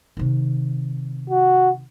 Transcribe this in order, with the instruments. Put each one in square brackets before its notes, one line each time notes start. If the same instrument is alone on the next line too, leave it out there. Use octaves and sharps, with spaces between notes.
[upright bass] C3 D#3
[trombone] F#4